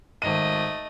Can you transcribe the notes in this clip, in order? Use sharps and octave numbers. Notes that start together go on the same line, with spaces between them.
G#1 A3 D#5 D#7